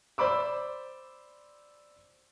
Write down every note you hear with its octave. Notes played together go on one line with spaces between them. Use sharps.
C5 D5 B5 D6 E6